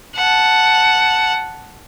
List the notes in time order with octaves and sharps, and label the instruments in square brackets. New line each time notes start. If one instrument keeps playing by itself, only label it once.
[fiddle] F#5 A5